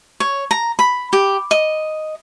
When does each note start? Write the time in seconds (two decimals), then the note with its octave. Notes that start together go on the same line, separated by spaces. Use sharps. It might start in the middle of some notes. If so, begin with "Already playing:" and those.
0.20 C#5
0.51 A#5
0.79 B5
1.13 G4
1.51 D#5